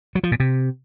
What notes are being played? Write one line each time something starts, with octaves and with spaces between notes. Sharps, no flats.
F#3
F3
A#2
C3